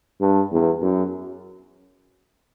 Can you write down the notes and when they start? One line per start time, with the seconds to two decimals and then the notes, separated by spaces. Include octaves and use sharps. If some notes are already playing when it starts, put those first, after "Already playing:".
0.21 G2
0.52 E2
0.82 F#2